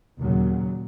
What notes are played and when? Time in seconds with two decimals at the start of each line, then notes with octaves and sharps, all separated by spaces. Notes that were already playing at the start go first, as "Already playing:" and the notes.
0.20 D#2 A#2 C#3 F#3